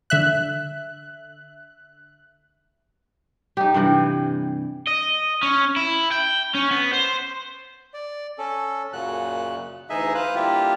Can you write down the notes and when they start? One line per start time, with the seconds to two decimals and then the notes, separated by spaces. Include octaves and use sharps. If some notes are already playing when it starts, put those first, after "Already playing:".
0.10 D3 E5 F#6
3.57 D#4 G4
3.74 G2 C3 E3
4.88 D#5
5.43 C#4
5.76 E4
6.12 G5
6.55 C#4
6.71 B3
6.93 C5
7.94 D5
8.38 C#4 A4
8.93 F#2 A#2 C#3 F#3 F#6
9.90 D2 E3 D#4 G#4 D#5 E5
10.15 B4 C5 F5 F#6
10.35 D3 G3 A#3 E4 F4 G4